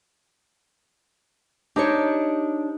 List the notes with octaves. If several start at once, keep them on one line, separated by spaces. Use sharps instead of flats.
D4 D#4 G4 C5 C#5 D6